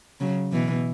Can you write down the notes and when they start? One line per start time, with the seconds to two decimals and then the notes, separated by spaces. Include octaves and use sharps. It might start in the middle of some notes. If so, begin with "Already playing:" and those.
0.20 C#3 F#3
0.52 B2 E3